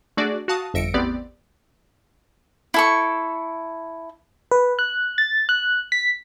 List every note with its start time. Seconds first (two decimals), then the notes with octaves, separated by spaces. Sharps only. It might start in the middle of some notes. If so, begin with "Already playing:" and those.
0.17 A3 D4 F#4 G#4 D5
0.48 F#4 F5 A5 D#6
0.74 G1 F2 E5 A#6 C#7 D7
0.94 A1 E2 B3 C4 G4 D5
2.74 E4 A4 C#6
4.51 B4
4.79 F#6
5.18 A6
5.49 F#6
5.92 B6